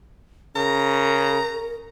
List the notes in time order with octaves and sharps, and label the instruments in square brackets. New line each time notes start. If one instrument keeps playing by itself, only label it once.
[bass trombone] C#3 [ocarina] A#4 [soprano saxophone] A#5